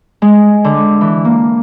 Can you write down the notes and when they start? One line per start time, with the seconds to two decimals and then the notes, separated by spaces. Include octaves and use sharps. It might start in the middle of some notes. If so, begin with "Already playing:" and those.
0.22 G#3
0.64 D3
1.01 E3
1.25 A#3